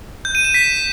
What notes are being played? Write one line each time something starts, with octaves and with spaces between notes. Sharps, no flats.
G6
D#7
E7
B6